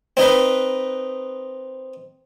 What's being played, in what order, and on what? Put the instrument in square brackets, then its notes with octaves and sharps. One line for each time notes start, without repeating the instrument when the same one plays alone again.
[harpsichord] C4 D#4 B4